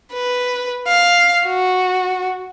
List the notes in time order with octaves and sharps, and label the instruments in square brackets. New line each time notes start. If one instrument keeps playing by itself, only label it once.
[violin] B4
F5
F#4